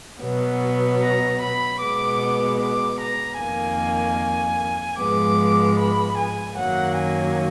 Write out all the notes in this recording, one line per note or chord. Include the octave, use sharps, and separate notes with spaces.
B2 F#3 B3
A#5
B5
B2 G#3 B3 D6
D6
A#5
F2 D#3 A#3 G#5
G#2 F3 G#3 B3 D6
B5
G#5
F#2 D#3 F#3 A#3 F#5
G#5